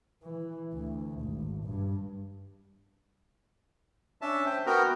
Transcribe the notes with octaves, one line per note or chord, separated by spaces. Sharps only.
E3
D2
G#1
G2
C#4 D4 E5 A5
C5 E5 G5
B3 F#4 A#4 G5 A#5